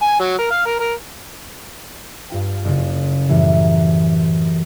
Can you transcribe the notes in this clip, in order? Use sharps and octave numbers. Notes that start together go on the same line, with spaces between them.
G#5
F#3
A#4
F5
A#4
A#4
G2 F4 G5
F#1 C#3
F#2 A2 E3 G3
A#6